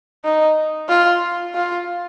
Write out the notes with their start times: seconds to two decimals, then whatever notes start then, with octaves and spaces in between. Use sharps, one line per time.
0.25 D#4
0.89 F4
1.55 F4